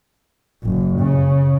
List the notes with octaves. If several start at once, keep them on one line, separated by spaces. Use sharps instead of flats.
F#1
C#3